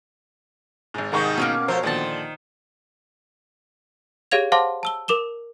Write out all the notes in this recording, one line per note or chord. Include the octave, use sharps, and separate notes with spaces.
G#1 G#2
C2 D#3 G#3 D#4 A#4 C#6
B2 A#3 C4 C#4
F3 A3 A#4 C5 C#5
A#2 D3 D#3 F3 C5 A5
G4 G#4 C#5 F5 G#6 F7
C5 F5 F#5 A5 C6 D6
A5 E6 G7
A#4 D6 E7 G7